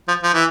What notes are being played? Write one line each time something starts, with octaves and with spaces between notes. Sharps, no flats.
F3
F3
E3